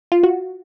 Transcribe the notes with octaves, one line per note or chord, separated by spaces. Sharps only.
F4
F#4